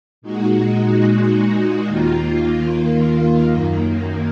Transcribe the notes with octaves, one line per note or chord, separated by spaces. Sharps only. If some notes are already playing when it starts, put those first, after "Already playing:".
A#2 G#3 D#4 F#4
D#2 D#3 A#3 F4
F#2 D#3 A#3